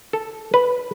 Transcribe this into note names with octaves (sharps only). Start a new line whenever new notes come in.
A4
B4